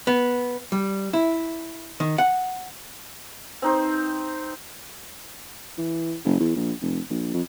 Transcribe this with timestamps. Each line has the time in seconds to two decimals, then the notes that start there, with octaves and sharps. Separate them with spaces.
0.07 B3
0.72 G3
1.13 E4
2.00 D#3
2.18 F#5
3.62 C4 D#4 C5
5.78 E3
6.25 F#1
6.40 E2
6.56 A#1
6.81 F1
7.10 A#1
7.34 F2